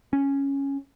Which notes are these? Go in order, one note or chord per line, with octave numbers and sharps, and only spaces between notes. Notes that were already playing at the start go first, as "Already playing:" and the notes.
C#4